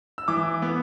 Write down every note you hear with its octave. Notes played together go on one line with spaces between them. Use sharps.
E6
E3 D6
B3